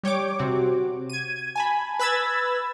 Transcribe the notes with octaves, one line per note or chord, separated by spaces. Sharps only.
G3 C#5 G5 D6
C3 C4 F#4
G#6 D#7
G#5 A5 B5
B4 B5 E6 G#6 A6